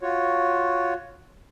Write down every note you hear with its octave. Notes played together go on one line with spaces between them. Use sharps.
F4 F#4 C#5